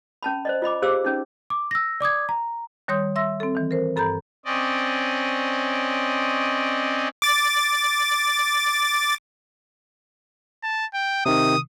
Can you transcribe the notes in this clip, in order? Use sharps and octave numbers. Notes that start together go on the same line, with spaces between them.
C#4 A5 B5
C5 D5 D#5
F4 D#5 B5 D6
G4 G#4 C5 F5 D6 E6
C#4 D#4
D6
E6 A#6
D5 D6 D#6 G#6
A#5
D#3 G3 C#5 C6 D#6 G6
E5 C6 E6 A#6
C4 A4
D#3 E3
A#4 C5
G2 A4 A#5 B5 G6
C4 C#4 D5 D#5
D6 A6
A5
G5
C3 D#3 D#6